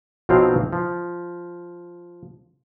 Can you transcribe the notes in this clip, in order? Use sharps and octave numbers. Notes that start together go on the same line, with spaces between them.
B1 B2 F3 F#3 C4 F5
F3